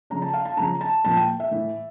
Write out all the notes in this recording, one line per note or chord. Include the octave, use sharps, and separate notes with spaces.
C#3 F3 A#5
A5
F5
A5
C#3 F3 A#5
A5
A#2 F3 A5
G5
E5
A2 E3